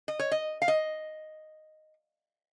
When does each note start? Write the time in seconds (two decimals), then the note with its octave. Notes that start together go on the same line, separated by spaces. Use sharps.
0.08 D#5
0.19 C#5
0.32 D#5
0.62 F5
0.68 D#5